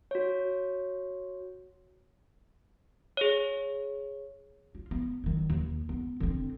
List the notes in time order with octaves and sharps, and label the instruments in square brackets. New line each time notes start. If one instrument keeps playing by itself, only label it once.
[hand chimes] F#4 C#5
[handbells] G#4 C#5
[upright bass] F4
B3
D#3 F#3
D#2
B3
D3 C4